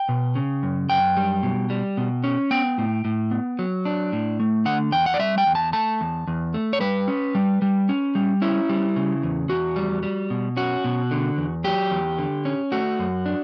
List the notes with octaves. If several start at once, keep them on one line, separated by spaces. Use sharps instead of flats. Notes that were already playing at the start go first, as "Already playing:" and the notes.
Already playing: G5
B2
C#3
F#2
F#2 G5
G3
B2
G3
B2
C#4
B3 G5
A2
A2
B3
F#3
D4
A2
A3
D3 F#5
E2 G5
F#5
D5
G3 E5
G5
E2
A5
A3 A5
E2
E2
A3
C#5
G3 B4
C#4
G3
G3
C#4
G3
C#4 E4
G3
C#3
E2
E2 F#4
G3
G3
B2
C#4 F#4
B2
D3
E2
F#3 G4
E2
D3
C#4
A3 F#4
F#2
D4